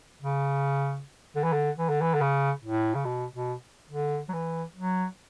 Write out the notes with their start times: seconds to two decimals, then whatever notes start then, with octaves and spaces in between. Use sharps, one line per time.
0.22 C#3
1.36 D3
1.44 E3
1.53 D3
1.79 E3
1.89 D3
2.02 E3
2.14 D3
2.21 C#3
2.64 A2
2.95 C#3
3.05 B2
3.34 B2
3.90 D3
4.29 F#3
4.33 E3
4.76 F#3